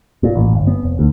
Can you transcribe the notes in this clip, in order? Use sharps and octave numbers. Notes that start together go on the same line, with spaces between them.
A#2
A1
G1
B3
F1
D2